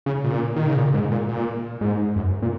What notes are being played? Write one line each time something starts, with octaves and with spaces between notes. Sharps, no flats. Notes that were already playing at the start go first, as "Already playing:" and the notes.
C#3
A#2
D#3
C#3
A#2
G#2
A#2
A#2
G#2
F#2
A#2